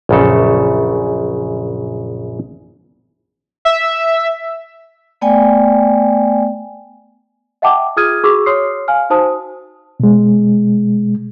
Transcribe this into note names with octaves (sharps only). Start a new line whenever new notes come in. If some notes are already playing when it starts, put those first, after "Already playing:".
A#1 F#2 C#3 A4
E5
A3 B3 D5 G5 G#5
D#5 E5 F#5 G5 A5 D6
F4 G#4 D#6 F6 G#6 D#7
F#4 G#4 C#6 D6 E6
C#5 C6 D#6 F6 C7
F5 G#5 F6
D#4 F#4 C5 A5 D#6
B2 G#3